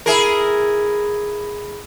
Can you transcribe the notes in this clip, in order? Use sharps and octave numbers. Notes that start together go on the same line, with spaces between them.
E4 G#4 A#4